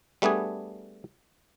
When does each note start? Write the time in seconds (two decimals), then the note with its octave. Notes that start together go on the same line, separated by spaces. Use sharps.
0.22 G3 A3 B3 D4 G#4